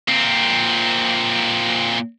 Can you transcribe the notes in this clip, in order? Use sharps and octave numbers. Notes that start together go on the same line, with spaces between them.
A#2 C4